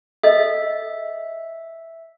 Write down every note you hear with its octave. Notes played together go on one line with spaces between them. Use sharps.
A4 D#5 E5